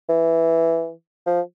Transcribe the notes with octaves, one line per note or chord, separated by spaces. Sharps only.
E3
F3